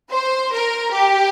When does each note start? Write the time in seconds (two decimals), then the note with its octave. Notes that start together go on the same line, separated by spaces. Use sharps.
0.10 C5
0.52 A#4
0.94 G4